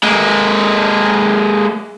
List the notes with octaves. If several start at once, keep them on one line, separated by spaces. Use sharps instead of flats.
G#3 A#3